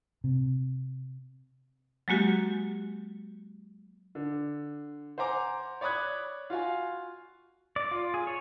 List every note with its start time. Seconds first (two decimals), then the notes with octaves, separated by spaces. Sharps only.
0.24 C3
2.08 F#3 G#3 A#3 F#4 G4
4.15 D3
5.18 C5 F#5 G#5 A#5 D6
5.81 C#5 D5 B5 D#6 F#6 G#6
6.50 F4 F#4 F5 G#5
7.76 D5
7.91 F4
8.14 G#4
8.27 C#5